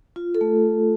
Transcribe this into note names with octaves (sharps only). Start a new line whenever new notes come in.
F4
A4
A3